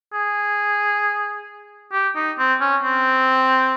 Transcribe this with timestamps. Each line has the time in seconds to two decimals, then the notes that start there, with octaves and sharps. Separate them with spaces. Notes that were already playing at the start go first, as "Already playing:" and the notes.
0.13 G#4
1.92 G4
2.15 D#4
2.38 C4
2.61 C#4
2.83 C4